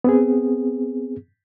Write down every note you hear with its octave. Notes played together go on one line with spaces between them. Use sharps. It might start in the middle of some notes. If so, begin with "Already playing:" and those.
B3 C4 G#4